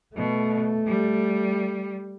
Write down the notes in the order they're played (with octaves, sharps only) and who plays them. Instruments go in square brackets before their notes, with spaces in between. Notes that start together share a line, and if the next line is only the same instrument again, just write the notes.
[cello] B2 [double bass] A3
[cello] G3